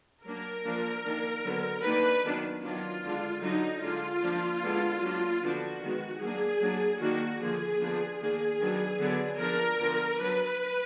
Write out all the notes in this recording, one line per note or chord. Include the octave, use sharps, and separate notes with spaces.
F#3 A#3 D4 A#4
F3 A#3 D4
D#3 A#3 D4
D3 F#3 B3
D#3 A#3 D4 B4
D#3 F#3 B3 D4
D#3 F#3 B3 D4 F4
D3 G#3 D4
D3 F#3 D4 D#4
D3 G#3 D4 F4
F3 A#3 D4
D3 G#3 B3 D4
F#3 A#3 D4
D3 F3 B3 D4 F#4
D#3 G#3 B3
F#3 A#3 D4 G#4
F#3 A#3 D4
D#3 A#3 D4 F#4
D3 F3 A#3 G#4
D3 F3 B3 D4
D#3 A#3 D4 G#4
D#3 F#3 B3 D4
D3 F#3 B3 D4
F3 B3 D4 A#4
D3 F3 B3 D4
F#3 D4 B4